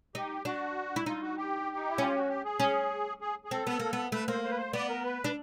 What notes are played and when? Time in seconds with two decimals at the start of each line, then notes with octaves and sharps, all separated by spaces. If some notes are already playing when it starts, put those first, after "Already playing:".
0.15 D#4 G4
0.45 D4 F#4
0.96 E4
1.06 D#4 F4
1.22 F#4
1.37 G4
1.77 D#4
1.90 E4
1.98 C#4 F4
2.16 F#4
2.29 G4
2.45 G#4
2.60 C#4
3.21 G#4
3.45 G#4
3.51 C4 A4
3.67 B3
3.79 A#3
3.93 B3
4.12 A3 B4
4.28 A#3 C5
4.44 C5
4.51 B4
4.58 C5
4.73 B3 D5
4.89 A#4
5.04 B4
5.24 D4